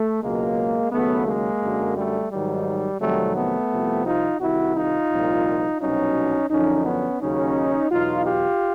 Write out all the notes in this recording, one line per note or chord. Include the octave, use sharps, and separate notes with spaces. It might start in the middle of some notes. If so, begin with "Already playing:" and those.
Already playing: A3
C#2 B2 F#3 G#3 A#3
D#2 C#3 F#3 A3 B3
G#3 A#3
F#2 D3 F#3
G3 A3
G#2 D#3 F#3 G3
F2 C3 D#3 F#3 G3 A3
A3 B3
C2 C3 F3
D#4 F4
C2 C3 D#3 E4 F#4
D#4 F4
C2 A#2 F3
C2 B2 F#3 C#4 D#4
F#2 D3 F3 C#4 D#4
B3 C#4
D#2 C#3 F#3 C#4 D#4
E2 B2 F#3 D#4 F4
F4 G4